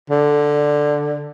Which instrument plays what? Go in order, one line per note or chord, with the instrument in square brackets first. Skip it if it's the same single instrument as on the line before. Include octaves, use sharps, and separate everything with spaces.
[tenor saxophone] D3